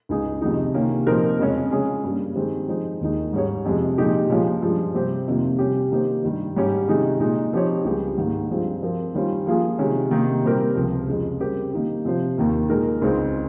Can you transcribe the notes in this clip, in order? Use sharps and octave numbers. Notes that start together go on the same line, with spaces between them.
C#2 C#3 G#3 D#4 G#4
F2 C3 D#3 G#3 D#4
C3 D#3 A#3 C#4
A#2 F3 C4 D#4 A#4
F2 C#3 G#3 C#4
C#3 G#3 C#4 G#4
G2 G3 A#3
D#3 G#3 C4 G4
F3 G#3 D#4 G#4 C5
D#2 D#3 G#3 D#4
G#2 G3 C#4 G#4 C#5
F2 C3 F3 G#3
A#2 F3 G#3 D#4 G4
A#2 F3 G#3 C#4 F4
G2 F3 G#3
C3 G3 C4 G4 C5
F2 C3 D#3 A#3 F4
C3 G3 C#4 G4
D#3 A#3 D#4 G4 C5
G2 D#3 G3
G#2 G3 C#4 G4
C3 D#3 G#3 D#4 G#4
A#2 G#3 D#4
F3 C4 D#4 G4 C#5
C#2 C#3 G3 C#4 G4
G#2 D#3 A#3
G2 F3 G#3 C4 F4
F3 C4 F4 A#4
D#3 G3 C#4 F4 C5
F3 A#3 F4 G#4
C3 D#3 G#3 C#4
C3 D#3 A#3 D#4
A#2 G3 C4 G4 A#4
C#2 C3 F3
F2 C#3 G#3
C#3 G3 C4 G4 A#4
D#3 A#3 D#4 G4
C3 F3 C4 F4 C5
D#2 D#3 A#3
A#2 G#3 D#4 A#4
C#2 C#3 G#3 C4 D#4